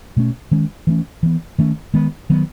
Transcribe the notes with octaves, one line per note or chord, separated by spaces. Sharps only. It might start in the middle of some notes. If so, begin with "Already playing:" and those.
B2 A3 C#4
D#3 G#3 C#4
E3 A3 C#4
E3 B3
D#3 A3 C#4
D#3 G#3 B3
D#3 F#3 B3